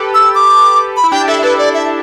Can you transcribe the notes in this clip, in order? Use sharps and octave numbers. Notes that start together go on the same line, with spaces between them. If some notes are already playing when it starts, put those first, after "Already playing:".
Already playing: G4 A4 B4
E6
D6
B5
E4
D4 G4 G5
E4 A4 E5
E4 A4 B4
D5
E5